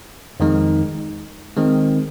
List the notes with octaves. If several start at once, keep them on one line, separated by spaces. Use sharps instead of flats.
F2 D#3 G#3 D#4
D#3 G#3 C4